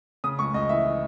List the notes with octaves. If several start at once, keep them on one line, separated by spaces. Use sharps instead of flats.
C#3 D#6
C#2 C#6
C#2 D#5
E3 E5
E3